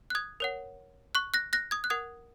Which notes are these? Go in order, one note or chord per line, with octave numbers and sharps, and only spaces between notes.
F#6
D#6 G#6
A#4 C#5 F#5
C#6 F#6
F#6 A#6
F#6 A#6
D#6 G#6
F#6
A#4 F#5 D#6 G#6